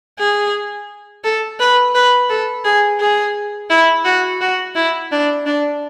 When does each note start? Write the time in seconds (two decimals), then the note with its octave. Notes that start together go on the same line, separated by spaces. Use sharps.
0.19 G#4
1.24 A4
1.59 B4
1.95 B4
2.30 A4
2.65 G#4
3.00 G#4
3.70 E4
4.05 F#4
4.41 F#4
4.76 E4
5.12 D4
5.46 D4